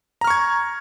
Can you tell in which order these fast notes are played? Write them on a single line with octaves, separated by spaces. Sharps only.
A#5 F6 C#6 G#6